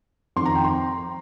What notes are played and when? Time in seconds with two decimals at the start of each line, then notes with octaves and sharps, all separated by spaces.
0.36 F2 D#3 C6
0.45 A#5
0.55 G5
0.64 C6